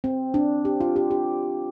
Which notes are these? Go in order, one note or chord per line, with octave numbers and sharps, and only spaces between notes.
C4
D4
G4
F4
G4
G4